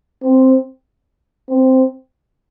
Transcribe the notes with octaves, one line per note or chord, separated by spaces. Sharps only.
C4
C4